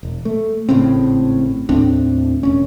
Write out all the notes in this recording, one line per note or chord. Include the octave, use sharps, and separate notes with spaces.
E1
A3
G#1 A2 C#3 C4
D#2 A2 C4 D4
E1 C#4